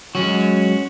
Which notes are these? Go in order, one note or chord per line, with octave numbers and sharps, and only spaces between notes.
F#3 G#3 C#4 F#4